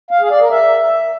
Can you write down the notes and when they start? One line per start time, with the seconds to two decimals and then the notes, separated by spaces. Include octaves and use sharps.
0.11 F5
0.21 G#4
0.31 D5
0.40 A#4
0.50 E5